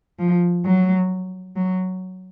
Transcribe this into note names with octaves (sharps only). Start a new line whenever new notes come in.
F3
F#3
F#3